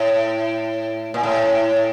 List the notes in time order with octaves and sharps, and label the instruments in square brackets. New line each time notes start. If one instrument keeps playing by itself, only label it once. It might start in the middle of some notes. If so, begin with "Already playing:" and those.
Already playing: [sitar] A2
A#2
A2